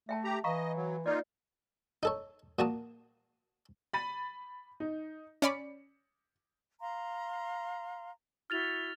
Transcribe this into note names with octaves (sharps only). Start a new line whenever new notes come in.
A3 E5 G5 A5
G4 A#5
E3 D#5 F5 A#5 C#6
F#3
A#3 D#4 F4 D5
D#4 A4 C#5
A#2 A#3 F#4 A5 D#6
B5 A6 D#7
D#4
C#4 D5 B5 C#7
F5 A#5 C6
E4 F#4 F6 A6 F7